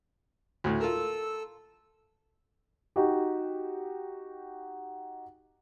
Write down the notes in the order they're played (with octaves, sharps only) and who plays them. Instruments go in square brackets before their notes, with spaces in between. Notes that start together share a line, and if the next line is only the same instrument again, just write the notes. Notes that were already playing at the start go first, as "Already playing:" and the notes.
[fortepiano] D2 A2
[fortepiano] F4 A#4 [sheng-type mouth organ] A4 E6
[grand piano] D#4 F#4 G4